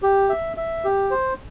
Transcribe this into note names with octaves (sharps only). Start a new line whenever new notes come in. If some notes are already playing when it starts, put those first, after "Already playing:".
G4
E5
E5
G4
C5